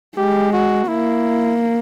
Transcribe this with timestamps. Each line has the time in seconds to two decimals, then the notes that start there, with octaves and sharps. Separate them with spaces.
0.17 G#3 G4
0.53 F#4
0.88 A#3 E4